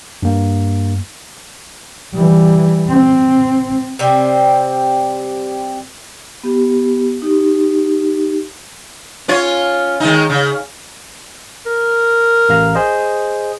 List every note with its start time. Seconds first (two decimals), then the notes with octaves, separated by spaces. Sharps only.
0.23 G2 A#3
2.13 E3 G3
2.88 C4
3.99 C3 G3 C4
6.43 B3 G4
7.22 D#4 G4
9.28 C#4 F4 C#5
10.00 D#3 G#3 D#4
10.30 C#3
11.66 A#4
12.49 A1 F5 A#5
12.75 G#4 C5 D#5